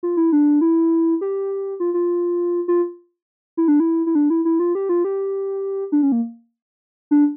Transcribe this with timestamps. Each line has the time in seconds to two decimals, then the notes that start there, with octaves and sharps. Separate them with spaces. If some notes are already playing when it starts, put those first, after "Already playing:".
0.03 F4
0.17 E4
0.32 D4
0.61 E4
1.21 G4
1.80 F4
1.94 F4
2.68 F4
3.57 E4
3.68 D4
3.80 E4
4.06 E4
4.15 D4
4.30 E4
4.45 E4
4.59 F4
4.75 G4
4.89 F4
5.04 G4
5.92 D4
6.03 C#4
6.12 A#3
7.11 D4